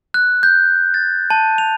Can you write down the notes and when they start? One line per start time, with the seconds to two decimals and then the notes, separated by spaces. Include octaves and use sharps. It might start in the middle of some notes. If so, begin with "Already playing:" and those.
0.14 F#6
0.43 G6
0.94 A6
1.30 A5
1.58 F7